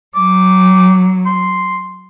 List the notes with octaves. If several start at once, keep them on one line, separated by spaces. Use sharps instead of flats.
F#3 D6
C6